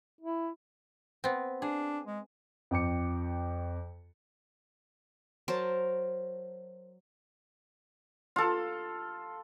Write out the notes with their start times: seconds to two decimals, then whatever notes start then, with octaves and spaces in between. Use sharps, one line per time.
0.21 E4
1.24 B3 C4
1.62 D4 G#4
2.06 G#3
2.71 F2 G5 D6 C#7
5.48 F#3 A#4 C5 A5
8.36 F4 A4